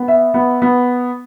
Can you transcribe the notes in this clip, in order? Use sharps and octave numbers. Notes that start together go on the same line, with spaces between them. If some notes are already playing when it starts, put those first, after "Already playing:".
Already playing: B3
E5
B3
B3